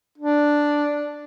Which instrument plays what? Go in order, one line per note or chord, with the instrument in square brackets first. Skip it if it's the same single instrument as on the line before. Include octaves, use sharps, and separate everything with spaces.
[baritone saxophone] D4